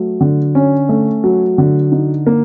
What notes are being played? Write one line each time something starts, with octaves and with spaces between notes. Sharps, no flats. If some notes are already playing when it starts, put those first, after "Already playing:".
Already playing: F#3 A3
D3
C#4
A3
F#3
D3
D#4
A#3